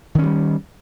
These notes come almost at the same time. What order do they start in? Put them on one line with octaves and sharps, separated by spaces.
D#3 C#4 F3 G3